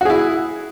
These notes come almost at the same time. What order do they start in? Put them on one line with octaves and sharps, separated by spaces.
F#4 G#4 E4